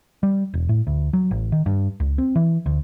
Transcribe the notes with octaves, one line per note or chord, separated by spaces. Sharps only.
G3
E1
A2
D2
F#3
A1
D#3
G2
C#2
C4
E3
D2